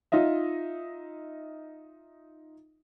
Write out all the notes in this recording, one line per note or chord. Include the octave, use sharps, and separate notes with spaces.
D#4 F4 D#5 E5